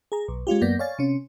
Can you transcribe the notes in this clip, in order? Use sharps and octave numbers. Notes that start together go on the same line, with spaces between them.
G#4 A#5
B1
G#3 C#4 F4 G4
F#2 A#3 B3 D5 G6 A#6
C#5 D5 F5 G#5 A6
C3 C#4